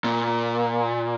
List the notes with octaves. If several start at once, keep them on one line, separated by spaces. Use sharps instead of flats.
A#2